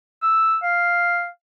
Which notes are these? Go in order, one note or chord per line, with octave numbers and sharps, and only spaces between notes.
E6
F5